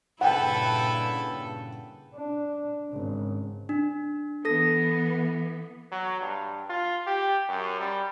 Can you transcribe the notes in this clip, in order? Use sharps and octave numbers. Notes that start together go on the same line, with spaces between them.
G2 A#2 C#3 E4 A4 B4 F#5 G5
D4
G#1 C#3
D4
E3 B3 A4 A#6
F#3
G2
F4
G4
F#2
G3